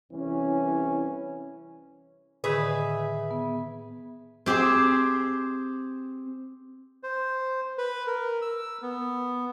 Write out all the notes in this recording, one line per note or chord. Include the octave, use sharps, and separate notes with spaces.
C2 E3 C#4
A2 D3 D#3 G#4 B4 E5
B3
C4 G4 G#4 C5
C5
B4
A#4
E6
B3